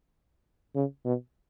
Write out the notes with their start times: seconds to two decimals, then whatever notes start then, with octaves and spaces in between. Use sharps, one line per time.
0.76 C#3
1.05 B2